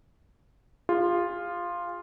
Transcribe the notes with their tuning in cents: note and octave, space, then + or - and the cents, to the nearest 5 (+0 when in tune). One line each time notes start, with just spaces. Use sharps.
F4 +0 G#4 -45